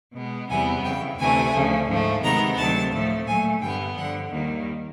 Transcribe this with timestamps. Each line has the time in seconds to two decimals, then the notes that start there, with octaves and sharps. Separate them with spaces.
0.15 B2 G#3 B3
0.49 E2 C3 E3 G3 B3 G#5
0.85 F2 C#3 E3 G5
1.19 D2 C3 E3 A3 G#5
1.55 D2 C#3 F3
1.88 G#2 F3 A3
2.23 C3 D#3 G#3 B3 A#5
2.58 D2 C3 D#3 F#3 A5
2.93 A2 F3 A3
3.27 A#2 F#3 A3 G#5
3.62 G2 D3 G3 B3 G5
3.97 G2 D3 F3 F#5
4.32 D#2 D#3 G3 A#3